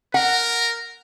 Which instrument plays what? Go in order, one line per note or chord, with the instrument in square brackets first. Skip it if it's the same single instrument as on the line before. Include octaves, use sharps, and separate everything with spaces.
[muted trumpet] A#4 [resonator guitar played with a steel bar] F#5